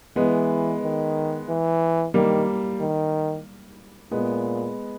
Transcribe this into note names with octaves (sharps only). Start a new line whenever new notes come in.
E3 G#3 B3
D#3
E3
D#3 G3 A#3
D#3
A#2 G#3 B3